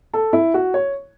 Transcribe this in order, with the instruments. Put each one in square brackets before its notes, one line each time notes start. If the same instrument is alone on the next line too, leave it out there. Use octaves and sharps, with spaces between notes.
[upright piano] A4
E4
F#4
C#5